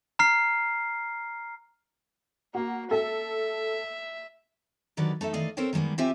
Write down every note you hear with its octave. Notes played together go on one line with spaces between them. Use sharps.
A#5 F6 C7
A#3 F#4
A4 E5
D3 D#3 F#3 G3 B4 D5
A3 D#4 A4 E5
D#3 E3 A3 D5 D#5 F5
C4 A4 A#4 C5 C#5 G5
D#3 G3 G#3 A#3 B3
C4 F4 G4 E5 G5 G#5